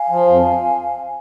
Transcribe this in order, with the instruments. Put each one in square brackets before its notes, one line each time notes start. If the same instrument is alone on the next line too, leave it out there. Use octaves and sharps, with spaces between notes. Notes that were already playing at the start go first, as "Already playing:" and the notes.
Already playing: [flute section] F5 G#5
[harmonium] F3
F2